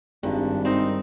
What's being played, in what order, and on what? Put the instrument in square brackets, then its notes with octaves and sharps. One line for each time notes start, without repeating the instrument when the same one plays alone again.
[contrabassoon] G#1 [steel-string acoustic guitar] G2 [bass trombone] D4
[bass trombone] D#3 [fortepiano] C4 D#4